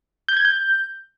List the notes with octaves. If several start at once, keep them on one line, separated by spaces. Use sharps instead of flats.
G6
G#6
G6